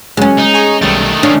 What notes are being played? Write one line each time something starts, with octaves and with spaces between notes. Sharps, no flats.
C#3 F#3 G#3 C#4
D#4
G#4 G#5 C#6
B1 D#3 G3 A3 A6
C#4 D4 F5